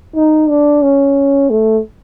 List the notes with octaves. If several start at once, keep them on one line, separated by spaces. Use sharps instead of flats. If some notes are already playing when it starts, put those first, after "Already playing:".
D#4
D4
C#4
A3